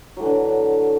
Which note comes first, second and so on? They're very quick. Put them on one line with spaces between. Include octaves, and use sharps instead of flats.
F#3 A2 E3 D3